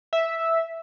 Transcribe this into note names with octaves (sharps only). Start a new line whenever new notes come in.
E5